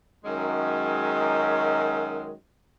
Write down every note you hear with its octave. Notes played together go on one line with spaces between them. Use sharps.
F#2 D#3 G#3